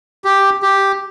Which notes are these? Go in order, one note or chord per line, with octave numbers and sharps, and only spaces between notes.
G4
G4